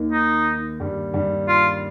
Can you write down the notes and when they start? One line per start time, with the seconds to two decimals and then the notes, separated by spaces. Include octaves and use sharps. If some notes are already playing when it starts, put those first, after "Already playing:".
Already playing: D#2 D#3
0.12 D#4
0.80 G2 G3
1.14 G2 G3
1.48 F4